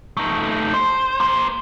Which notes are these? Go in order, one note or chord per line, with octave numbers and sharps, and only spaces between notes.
A3 D#4
C5
A#3 C5